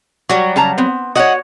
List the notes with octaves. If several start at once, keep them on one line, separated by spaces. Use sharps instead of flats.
F#3 G3 F#4
C#3 A5 A#5
B3 C4
F#4 C#5 D#5 F#5